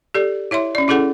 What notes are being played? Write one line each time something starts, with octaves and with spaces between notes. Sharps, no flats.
G4 A4 D5
E4 C#5 E5 C6
C#4 D5
C#4 E4 G#4 A4 F#5